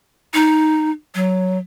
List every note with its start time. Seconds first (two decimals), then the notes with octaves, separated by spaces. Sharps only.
0.34 D#4
1.15 F#3